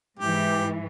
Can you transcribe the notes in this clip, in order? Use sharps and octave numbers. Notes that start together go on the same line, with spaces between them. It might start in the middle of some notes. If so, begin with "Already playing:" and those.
G#2 E3 G4